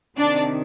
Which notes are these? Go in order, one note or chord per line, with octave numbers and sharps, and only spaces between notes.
C3 D#3 D4 D5